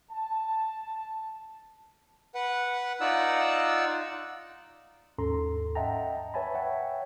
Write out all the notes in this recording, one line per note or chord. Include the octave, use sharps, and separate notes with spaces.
A5
B4 F#5
D#4 F4 D5 F#5 E6
D#2 G#2 C#4 A4 A#5 C6
D#5 E5 F#5 G5 A5 A#5
B4 C#5 E5 G#5 A5 B5
C#5 E5 F#5 G5